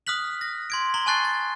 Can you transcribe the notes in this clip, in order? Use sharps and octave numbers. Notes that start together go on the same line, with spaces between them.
D#6 F6 F#6 B6 F#7
A#6
C6 G#6 D7
A#5 C6 G7
G#5 A5 C#6 F#6 A6 C7
A6